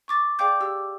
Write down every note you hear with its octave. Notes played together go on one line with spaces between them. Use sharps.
C#6 D6 A6
G#4 D5 F5 G5 D6 G6
G4 E6